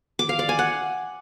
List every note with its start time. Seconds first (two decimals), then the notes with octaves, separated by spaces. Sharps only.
0.19 D6
0.29 F5
0.39 D5
0.49 G#5
0.59 F#5